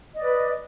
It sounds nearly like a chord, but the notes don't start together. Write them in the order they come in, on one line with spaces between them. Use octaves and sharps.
D#5 D5 B4